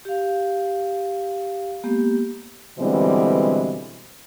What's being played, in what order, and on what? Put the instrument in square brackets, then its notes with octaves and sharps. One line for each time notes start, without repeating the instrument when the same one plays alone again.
[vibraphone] G4 F5
G#3 A#3 B3 G4
[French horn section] B2 D3 E3 G3 G#3 C4